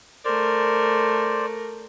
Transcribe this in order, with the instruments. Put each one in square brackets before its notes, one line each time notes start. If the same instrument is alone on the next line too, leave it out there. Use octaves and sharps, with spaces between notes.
[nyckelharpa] A3 A#4 [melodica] C5 D5